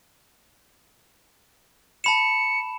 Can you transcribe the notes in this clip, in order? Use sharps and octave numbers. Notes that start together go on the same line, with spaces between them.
A5 B5 C#7 E7